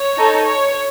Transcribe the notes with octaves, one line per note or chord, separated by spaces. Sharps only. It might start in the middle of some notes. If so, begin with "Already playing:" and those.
Already playing: C#5
D#4 A4
C#5